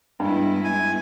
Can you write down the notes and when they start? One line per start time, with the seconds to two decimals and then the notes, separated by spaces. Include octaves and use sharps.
0.20 G2 G#3 B3 E4
0.64 G#5